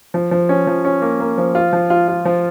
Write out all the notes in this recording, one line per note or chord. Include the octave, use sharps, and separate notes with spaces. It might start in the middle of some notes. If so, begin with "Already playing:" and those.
F3
F3
C#4
F3
C#4
A#3
A#3
F3
F4
F3
F4
F4
F3